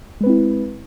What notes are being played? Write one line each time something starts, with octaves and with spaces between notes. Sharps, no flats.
G#3 C4 E4 B4